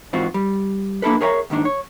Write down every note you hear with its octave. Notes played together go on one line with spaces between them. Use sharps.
G#2 E3 C4 F4 F#4
G3
A#3 D4 E4 A4 B4
G#4 A#4 C#5 E5 G5 A#5
D#2 G#2 D#3 D4
C#5